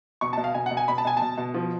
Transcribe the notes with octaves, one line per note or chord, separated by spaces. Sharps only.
B2 C#6
A5
B2
F5
B2 G#5
F#5
B2
G#5
B2 B5
A5
B2 G#5
B2 A5
B2
F3